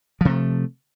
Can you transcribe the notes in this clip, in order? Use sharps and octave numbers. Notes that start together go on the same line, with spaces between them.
C3 F3 A3